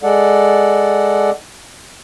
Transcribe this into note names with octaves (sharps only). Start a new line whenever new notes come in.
G#3 A4 D5 F#5